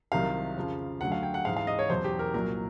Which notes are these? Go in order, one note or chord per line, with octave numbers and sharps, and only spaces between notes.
C2 C3 D#3 F#3 F5
F2 C#3 F3
D2 D3 F#3 F#5
F5
G5
F#5
G#2 E3 F5
F5
D#5
C#5
E2 B2 F#3 C5
G4
A#4
C2 A#2 F#3 A#4